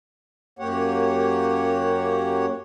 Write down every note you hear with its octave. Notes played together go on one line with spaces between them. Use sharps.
F#2 A#3 G4 C#5 F#5